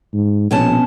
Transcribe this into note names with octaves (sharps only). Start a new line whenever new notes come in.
G#2
A#1 B2 C#4 A5